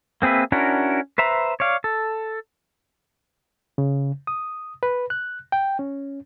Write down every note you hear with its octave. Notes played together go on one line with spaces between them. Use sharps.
A#3 C4 G#4 B4 E5
C#4 D4 E4 F#4 A#4
B4 C5 E5 A#5
C#5 D5 F5
A4
C#3
D#6
B4
F#6
G5
C#4